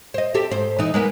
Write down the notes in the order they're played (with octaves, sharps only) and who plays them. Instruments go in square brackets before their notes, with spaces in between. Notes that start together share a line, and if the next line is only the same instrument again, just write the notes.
[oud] C5 D#5
C4 G4 A4
G#2 C5
E3 D#4
G#3 A#3 B3